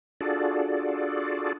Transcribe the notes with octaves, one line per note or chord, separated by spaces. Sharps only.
D4 F4 F#4 G#4 A4 D5